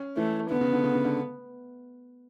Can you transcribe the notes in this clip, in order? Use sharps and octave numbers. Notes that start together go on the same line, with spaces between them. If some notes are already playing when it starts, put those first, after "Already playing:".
Already playing: C#4
E3 A3
D3 B3
C#3
D3
C#3
C#3
D3